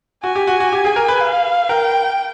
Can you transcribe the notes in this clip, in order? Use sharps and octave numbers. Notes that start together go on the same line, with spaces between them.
F#4 G#5
G4
F#4
F#4
G4
G#4
A#4
B4
F5
A#4 G5